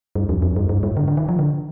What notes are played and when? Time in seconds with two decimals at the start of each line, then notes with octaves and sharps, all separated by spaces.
0.15 G2
0.29 F2
0.42 F2
0.56 G2
0.69 G2
0.83 G#2
0.97 D3
1.08 D3
1.17 D#3
1.29 F3
1.39 D3